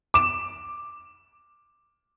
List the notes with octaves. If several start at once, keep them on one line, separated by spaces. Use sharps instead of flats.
D6 E7